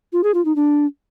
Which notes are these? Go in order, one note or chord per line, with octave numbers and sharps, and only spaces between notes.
F4
G#4
F4
D#4
D4